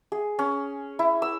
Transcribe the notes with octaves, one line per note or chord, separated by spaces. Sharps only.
G#4
C#4
E4
E6